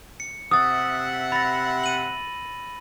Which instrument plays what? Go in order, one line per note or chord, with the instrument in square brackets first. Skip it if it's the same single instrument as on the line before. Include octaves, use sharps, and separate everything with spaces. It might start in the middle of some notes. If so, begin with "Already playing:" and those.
[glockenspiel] C#7
[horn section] C3 E5 F#5 [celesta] D#6 [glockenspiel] E6 A6
[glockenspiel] B5 A#6 [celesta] A6
[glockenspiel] D#7 F#7